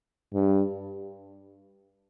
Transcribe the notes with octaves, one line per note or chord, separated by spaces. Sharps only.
G2